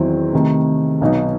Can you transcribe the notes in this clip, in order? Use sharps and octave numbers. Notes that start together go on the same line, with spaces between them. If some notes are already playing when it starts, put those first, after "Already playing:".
Already playing: E2 D#3 F#3 C4 E4
C3 D#3 A3
B1 B2 F#3 B3 D#4